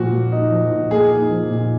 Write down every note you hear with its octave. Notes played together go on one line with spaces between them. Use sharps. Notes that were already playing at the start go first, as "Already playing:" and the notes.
Already playing: A#2 F3 F#4
A#3
D#4
F3
A#2
A#3 G#4
D#4
F3
A#2